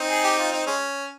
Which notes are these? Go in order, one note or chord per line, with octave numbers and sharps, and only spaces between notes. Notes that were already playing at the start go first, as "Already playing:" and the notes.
Already playing: C4 D#4
G#4
G4
F4
D#4
G#3 C#4